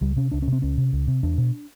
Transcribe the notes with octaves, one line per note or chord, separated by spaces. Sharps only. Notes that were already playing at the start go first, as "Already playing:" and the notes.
C#2 G3
C3 C#4
C#2 D4
C#4
C3
C4
C#2 C#4
C3
C#2
C3
E2 D4
B2